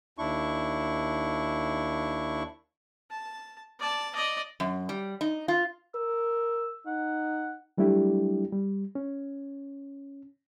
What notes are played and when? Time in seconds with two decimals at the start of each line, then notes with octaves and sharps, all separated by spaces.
0.18 D#2 D4 E4 C#6
3.10 A5
3.80 D5 A5
4.14 D5 D#5
4.60 F#2
4.89 G3
5.21 D#4
5.48 F4
5.95 A#4 E6
6.87 D#4 F#5
7.78 F#3 G3 A3 D4 E4 G4
8.52 G3
8.95 C#4